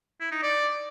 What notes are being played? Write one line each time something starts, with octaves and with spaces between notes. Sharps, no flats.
E4
D#4
D5